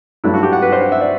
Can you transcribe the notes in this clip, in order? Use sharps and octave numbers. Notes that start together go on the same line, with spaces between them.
G2 F#3 A3 D4 E4
F#4
G4
F#5
B4
C5
F#5
E5
D5